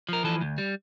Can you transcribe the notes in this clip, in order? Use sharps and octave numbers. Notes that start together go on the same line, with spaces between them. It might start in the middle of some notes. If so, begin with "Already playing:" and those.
F3 A#4
E3 A4
D2
G3